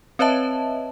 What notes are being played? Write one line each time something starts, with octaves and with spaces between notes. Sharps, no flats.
C4 B4 C#5 D#5 E5 A5